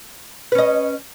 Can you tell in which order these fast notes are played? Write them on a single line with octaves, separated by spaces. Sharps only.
B4 C#4 D#5